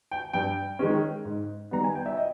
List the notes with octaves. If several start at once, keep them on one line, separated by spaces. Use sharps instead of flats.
G5
G2 G5
D#3 G#3 C#4
G#2
D#3 G3 B3 A#5
G#5
G5
E5
D#5